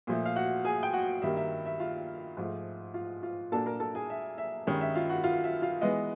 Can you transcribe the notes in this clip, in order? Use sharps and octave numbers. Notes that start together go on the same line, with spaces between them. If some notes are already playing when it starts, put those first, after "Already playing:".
A#2 F3 A3
F5
F#4 F#5
G#4 G#5
G5
F#4 F#5
G2 D#3 G3 A#3 E5
E5
E5
F4 F5
G#2 F3 A3
F4 F5
F4 F5
A#2 F#3 A#3 D4 A4 A5
A#4 A#5
A4 A5
G#4 G#5
E5
E5
G2 D#3 G#3 C#4
E5
F4 F5
F#4 F#5
F4 F5
E5
F4 F5
E3 G#3 B3 D#5